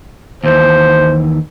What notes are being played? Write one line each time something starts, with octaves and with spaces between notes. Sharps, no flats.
D#2 E3 C5